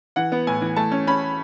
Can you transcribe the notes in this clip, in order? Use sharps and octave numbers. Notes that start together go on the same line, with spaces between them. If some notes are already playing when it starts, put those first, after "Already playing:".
E3 F#5
B3
A2 G#5
E3
A3 A5
C#4
C#4 B5